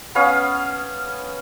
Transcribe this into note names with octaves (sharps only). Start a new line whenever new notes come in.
B3 C#4 F5